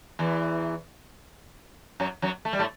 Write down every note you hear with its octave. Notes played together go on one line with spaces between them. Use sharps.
E2 E3
F#2 F#3
F#2 F#3
A3
G3
A2 A3